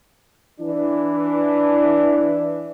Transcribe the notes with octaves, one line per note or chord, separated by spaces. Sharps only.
E3 D4